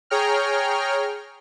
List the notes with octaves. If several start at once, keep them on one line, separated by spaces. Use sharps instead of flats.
G#4 C#5 G5 A#5 F6